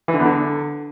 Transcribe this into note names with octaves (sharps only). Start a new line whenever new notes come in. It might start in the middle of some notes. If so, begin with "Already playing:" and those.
E3
D3
E2
D3